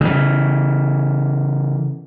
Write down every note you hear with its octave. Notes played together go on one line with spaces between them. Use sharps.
C#3 E3